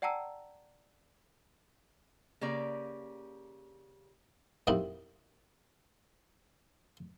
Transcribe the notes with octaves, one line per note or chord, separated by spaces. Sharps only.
D5 F#5 G5 A5 A#5 E6
C#3 A#3 G4 D5
F2 A#2 F#3 G3 D#4 E4